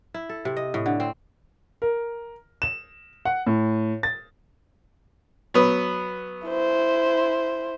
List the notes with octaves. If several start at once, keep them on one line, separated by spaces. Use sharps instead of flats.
E4
A4
C3
D#5
A2
D3
C4
A#4
E7
F#5
A2
A6
F#3 B3
E4 C5